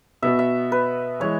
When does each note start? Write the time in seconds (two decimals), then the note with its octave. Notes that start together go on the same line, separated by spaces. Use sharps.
0.22 B2 B3 F#4 E5
0.39 E5
0.72 B4
1.20 E3 G#3 E4 C#5